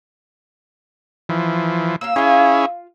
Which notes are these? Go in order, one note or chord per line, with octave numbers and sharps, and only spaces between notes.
E3 F3
A#3 C#4 F4 E6
C#4 E4 F4 G#4 F5